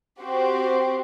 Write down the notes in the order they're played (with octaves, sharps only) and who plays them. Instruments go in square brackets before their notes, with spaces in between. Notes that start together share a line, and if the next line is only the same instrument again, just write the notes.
[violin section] C4 F#4 G4 C5